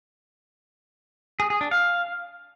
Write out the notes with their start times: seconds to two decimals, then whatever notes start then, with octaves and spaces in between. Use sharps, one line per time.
1.40 G#4
1.50 G#4
1.61 D4
1.71 F5